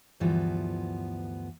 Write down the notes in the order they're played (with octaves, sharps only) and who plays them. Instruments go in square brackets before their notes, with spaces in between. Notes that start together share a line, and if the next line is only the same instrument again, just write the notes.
[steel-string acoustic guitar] D2 G2 E3 F3 B3